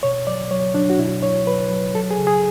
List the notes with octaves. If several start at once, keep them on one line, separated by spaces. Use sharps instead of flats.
B2 C#5
F#3 D5
F#3 C#5
F#3 D4
F#4
B2 E4
F#3 C#5
F#3 B4
F#3
F#3 A4
G#4
C#3
G#4